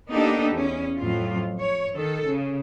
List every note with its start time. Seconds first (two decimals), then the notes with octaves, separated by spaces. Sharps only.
0.11 A#3 B3 D4 D#4 G4 A4
0.53 E2 C#4
0.97 F2 A2 F#3 F4
1.60 C#5
1.96 D#3 A4
2.28 C#3